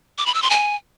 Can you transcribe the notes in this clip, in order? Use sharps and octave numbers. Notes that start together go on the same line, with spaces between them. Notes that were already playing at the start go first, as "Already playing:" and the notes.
D6
B5
E6
C6
G#5